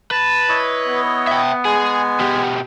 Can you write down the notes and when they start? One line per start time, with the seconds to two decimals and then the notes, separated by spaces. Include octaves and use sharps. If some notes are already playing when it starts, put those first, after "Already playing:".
0.11 B4 A5
0.49 E4 C#5 D#5
0.87 B3
1.27 E5 G5
1.65 G#3 G#4 G#5
2.20 B2 G4